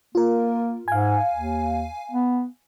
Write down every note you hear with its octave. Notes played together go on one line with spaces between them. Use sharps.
A#3 F4 A#4
G#2 F5 G#5
D#2
B3